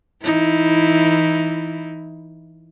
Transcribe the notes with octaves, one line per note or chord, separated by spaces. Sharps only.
E3 D#4 E4